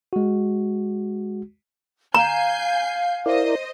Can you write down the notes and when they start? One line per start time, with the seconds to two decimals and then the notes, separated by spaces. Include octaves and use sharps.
0.13 G#3 F#4
2.15 F5 G#5 A#5 G6 C7
3.26 E4 A#4 C5 D5 D#5